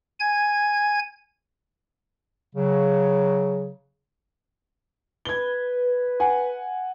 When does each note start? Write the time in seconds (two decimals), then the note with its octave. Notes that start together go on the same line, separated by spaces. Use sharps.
0.20 G#5 G#6
2.56 C#3 F#3
5.25 B4 G#6 G7
6.20 F#5 G#5